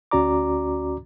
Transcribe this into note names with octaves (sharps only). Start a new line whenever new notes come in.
D2 C#4 F#4 D5 A#5 D6